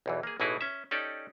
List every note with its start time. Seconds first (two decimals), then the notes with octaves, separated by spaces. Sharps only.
0.06 B1 E2 E3
0.23 A#3 G#4
0.40 A1 B2 E3 D#4 E4 G#4
0.61 C#4 E5
0.91 C#4 D#4 G4 A4 D5